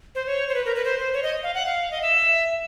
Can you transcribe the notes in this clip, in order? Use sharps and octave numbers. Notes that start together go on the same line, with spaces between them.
C5
C#5
C5
B4
A#4
B4
C5
C5
C#5
D#5
F5
F#5
F5
D#5
E5